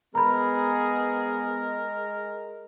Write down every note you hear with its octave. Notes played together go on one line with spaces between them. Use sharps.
G#3 B3 G#4 A#4 A#5 B5